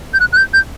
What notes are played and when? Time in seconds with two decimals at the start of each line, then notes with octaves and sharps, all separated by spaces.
0.14 G6
0.20 F#6
0.33 F#6
0.37 G6
0.54 G6